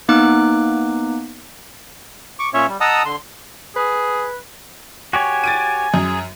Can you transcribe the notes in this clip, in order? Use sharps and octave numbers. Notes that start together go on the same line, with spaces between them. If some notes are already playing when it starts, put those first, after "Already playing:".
A#3 B3 D#4 D6 F#6
C#6 D6
A#2 C#4 C#5 E5
G3
D#5 F#5 A5 A#5 D#6 E6
D3 C6
G#4 B4
F#4 G4 C#5 G#5
A6 D7 D#7
F#2 G#4